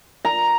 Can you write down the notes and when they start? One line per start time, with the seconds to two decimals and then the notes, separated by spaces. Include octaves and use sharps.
0.25 A#5